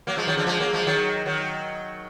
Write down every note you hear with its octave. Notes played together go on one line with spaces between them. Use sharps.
F#3 A#3
F3 G#3
D#3 F#3
D3 F3
F3 G#3
F#3 A#3
F3 G#3
D#3 F#3
D#3 F#3